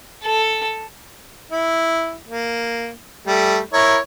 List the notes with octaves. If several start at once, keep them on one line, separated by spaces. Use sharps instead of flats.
A4
E4
A#3
G3 A3
E4 A#4 C#5